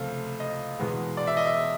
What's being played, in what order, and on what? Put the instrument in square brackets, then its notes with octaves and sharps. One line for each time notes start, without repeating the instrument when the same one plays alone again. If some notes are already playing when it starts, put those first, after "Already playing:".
Already playing: [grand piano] C#2 C3 F3 A3 F5
D#5
E2 B2 G#3 B3
D5
E5
D#5
E5